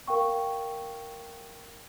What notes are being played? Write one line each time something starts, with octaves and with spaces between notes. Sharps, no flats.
A#4 F5 G5 C#6